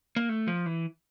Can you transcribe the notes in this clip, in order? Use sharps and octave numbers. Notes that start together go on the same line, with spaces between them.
A#3
A3
F3
E3